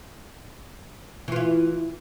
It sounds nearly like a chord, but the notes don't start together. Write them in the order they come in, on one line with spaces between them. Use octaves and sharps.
E3 F4 E4